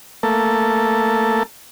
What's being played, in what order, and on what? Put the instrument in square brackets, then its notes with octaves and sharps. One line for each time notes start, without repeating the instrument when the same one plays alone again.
[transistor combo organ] A3 A#3 A4